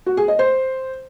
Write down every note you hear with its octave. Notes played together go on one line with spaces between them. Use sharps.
F#4
G#4
D#5
C5